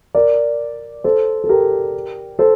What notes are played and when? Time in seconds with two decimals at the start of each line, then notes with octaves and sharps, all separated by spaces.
0.15 A#4 D5
1.04 A4 C5
1.44 A4
1.49 G4 A#4
2.39 A4 C5